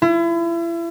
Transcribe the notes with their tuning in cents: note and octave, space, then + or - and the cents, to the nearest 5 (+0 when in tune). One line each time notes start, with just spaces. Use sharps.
E4 +35